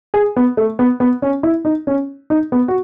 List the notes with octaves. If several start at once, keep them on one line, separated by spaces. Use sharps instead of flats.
G#4
B3
A3
B3
B3
C#4
E4
D#4
C#4
D#4
B3
F#4